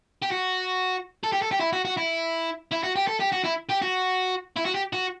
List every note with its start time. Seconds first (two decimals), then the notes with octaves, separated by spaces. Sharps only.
0.22 G4
0.31 F#4
1.23 A4
1.32 G4
1.42 A4
1.51 G4
1.60 E4
1.73 F#4
1.85 F#4
1.97 E4
2.71 E4
2.83 F#4
2.96 G4
3.08 A4
3.20 G4
3.33 F#4
3.45 E4
3.70 G4
3.82 F#4
4.56 E4
4.65 F#4
4.74 G4
4.93 F#4